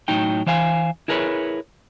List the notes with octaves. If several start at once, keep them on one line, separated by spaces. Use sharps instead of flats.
A2 F#3 D#4 G5
E3 C5 F5 G#5
E4 G#4 A#4 B4 C#5